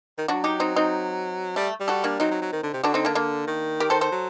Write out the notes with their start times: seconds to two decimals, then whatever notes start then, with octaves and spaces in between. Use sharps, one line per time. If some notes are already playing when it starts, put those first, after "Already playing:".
0.18 D#3
0.28 F#3 D4 F#4
0.44 D#4 G4
0.60 C4 D#4
0.76 C4 D#4
1.56 G3 A3
1.80 G3
1.88 F#4 A4
2.04 A#3 D4
2.20 F#3 C4 D#4
2.31 F#3
2.42 F#3
2.53 D#3
2.63 D3
2.73 C3
2.83 D3 D4 F#4
2.94 C4 D#4
3.05 A#3 D4
3.15 A#3 D4
3.47 D#3
3.80 G4 A#4
3.90 A4 C5
4.01 A4 C5
4.12 F#3